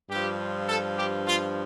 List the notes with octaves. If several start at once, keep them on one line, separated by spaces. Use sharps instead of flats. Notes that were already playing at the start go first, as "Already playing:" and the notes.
G2 F3 G4
A4
G4
F4